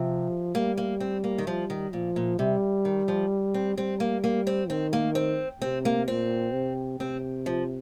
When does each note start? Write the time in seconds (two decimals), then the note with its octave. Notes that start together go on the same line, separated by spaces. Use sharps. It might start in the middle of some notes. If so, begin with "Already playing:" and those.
Already playing: C3 F3
0.55 G3 A#3
0.77 A#3
1.00 C4
1.24 A#3
1.38 D#3
1.47 F3 G3
1.70 D#3
1.93 A#2 F3
2.16 A#2
2.39 C3 G3
2.85 D#3
3.08 F3
3.54 C4
3.77 G3 C4
4.00 A#3
4.24 A#3
4.47 C4
4.69 D#3 C4
4.93 A#3
5.15 C4
5.61 C3 C4
5.85 A#3
6.08 A#2 C4
6.53 C3
7.00 C3 C4
7.46 F3